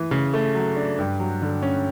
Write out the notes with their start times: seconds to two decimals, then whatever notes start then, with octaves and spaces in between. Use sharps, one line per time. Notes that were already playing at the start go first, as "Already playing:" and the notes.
Already playing: E3
0.11 C#3
0.34 A3
0.55 F#3
0.76 D4
0.98 G2
1.20 F#3
1.42 D3
1.63 C#4